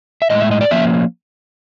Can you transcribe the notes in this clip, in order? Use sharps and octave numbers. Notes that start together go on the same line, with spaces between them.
E5
A2 E3 G#3 D#5
E5
D#5
D5
F3 A#3 C#4 E5